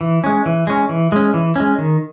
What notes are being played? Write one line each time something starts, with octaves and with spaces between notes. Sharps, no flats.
E3
G#3 C#4
E3
G#3 C#4
E3
G#3 C#4
E3
G#3 C#4
D#3